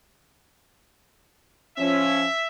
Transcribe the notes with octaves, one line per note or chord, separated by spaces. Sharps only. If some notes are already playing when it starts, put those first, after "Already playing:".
F3 C#4 E5